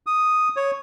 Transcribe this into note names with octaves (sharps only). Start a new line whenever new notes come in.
D#6
C#5